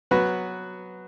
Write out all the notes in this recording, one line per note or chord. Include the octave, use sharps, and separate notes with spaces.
F#3 B3 F#4 B4